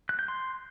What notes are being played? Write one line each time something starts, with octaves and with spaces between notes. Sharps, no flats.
F#6
G6
C6